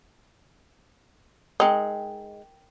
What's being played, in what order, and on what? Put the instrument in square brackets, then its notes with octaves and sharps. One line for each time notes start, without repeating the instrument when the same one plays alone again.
[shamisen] G#3 D#4 [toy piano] A#4 G5